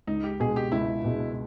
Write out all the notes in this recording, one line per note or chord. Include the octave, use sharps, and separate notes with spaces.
C#2 D#4
G4
B2 G#3 G#4
G4
C#2 E4
B2 G#3